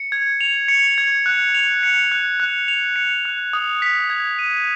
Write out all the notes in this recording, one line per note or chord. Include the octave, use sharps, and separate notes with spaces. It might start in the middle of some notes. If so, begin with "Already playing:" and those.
Already playing: C#7
G#6
F7
C#7
G#6
F#6
F7
C#7
F#6
F#6
F7
C#7
F#6
D#6
B6
G#6
D#7